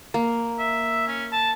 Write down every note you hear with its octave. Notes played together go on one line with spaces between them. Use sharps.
A#3
E5
C#4
A5